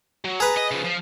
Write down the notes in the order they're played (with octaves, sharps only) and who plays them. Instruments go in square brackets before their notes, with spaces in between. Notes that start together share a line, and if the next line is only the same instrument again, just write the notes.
[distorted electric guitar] F#3
[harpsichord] G#4 B4 [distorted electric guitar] A#5
[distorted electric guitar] D#5
C#3 F3
F3